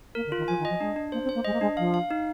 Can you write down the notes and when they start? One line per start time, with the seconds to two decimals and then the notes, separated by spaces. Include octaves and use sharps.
0.15 A#3 A#4
0.26 D3
0.32 F4
0.37 D#3
0.48 F3 G#5
0.59 D#3
0.65 F3 D#5
0.80 G#3 D4
0.96 D4
1.12 A#3 C5
1.23 C4
1.29 C5
1.35 A#3
1.45 G#3 D#5
1.53 A#3
1.61 G#3 D4
1.77 F3 F5
1.94 F5
2.11 D#4